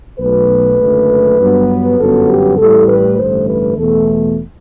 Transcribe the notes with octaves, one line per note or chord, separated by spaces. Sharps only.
B1 B2 A3 B4
F#1 F#2 D3 A3
G2 F#3 B3
G1 F#2 F#3 B3 A4
G4
A1 A2 G3 A4
B4
A1 G2 D3 A3 C5
B4
E2 B2 A3 A4